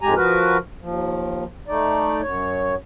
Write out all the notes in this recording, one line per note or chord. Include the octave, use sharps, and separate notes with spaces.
F2 G#2 G#3 G4 G#5 A#5
F3 F#4 A#4 B4
D#2 F3
A3 D#4 D5
F#2 C#5